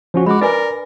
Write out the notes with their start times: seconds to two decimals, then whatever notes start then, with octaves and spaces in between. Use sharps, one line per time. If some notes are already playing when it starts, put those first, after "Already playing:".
0.14 F3 C#4 F#4
0.26 G#3 F#4 B5 D6
0.41 D4 A#4 B4 D5 G#5